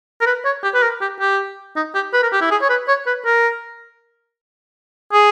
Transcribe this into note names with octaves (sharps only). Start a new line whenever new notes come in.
A#4
B4
C#5
G4
B4
A#4
G4
G4
D#4
G4
B4
A#4
G4
E4
G#4
C#5
B4
C#5
B4
A#4
G#4